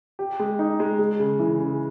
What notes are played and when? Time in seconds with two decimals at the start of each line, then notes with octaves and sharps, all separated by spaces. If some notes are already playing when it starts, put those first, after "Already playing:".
0.19 G4
0.40 G#3
0.59 D#4
0.80 G#3
0.99 G#3
1.19 C#3
1.39 E3
1.60 C#3